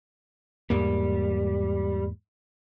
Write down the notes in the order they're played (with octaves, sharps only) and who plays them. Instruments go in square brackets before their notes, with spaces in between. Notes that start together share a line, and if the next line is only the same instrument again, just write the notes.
[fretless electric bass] E2 G#2 A#3 [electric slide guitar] G3